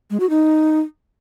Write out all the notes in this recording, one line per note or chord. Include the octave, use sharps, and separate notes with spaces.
G#3
F#4
D#4